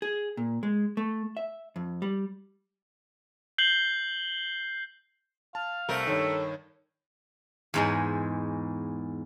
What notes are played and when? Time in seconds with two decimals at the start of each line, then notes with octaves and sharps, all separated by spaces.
0.02 G#4
0.37 A#2
0.63 G#3
0.97 A3
1.37 E5
1.76 F2
2.02 G3
3.58 G6 C7 F#7 G7
5.55 F5 A5
5.89 C2 A3 A#4 C5
6.07 G2 D#3 A4 C#5
7.74 E2 G#2 G#3